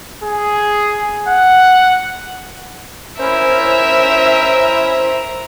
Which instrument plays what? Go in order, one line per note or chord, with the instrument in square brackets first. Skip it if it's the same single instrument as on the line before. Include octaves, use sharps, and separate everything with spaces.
[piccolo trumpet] G#4
F#5
[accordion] C#4 E4 [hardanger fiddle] A#4 [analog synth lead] C5 [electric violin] E5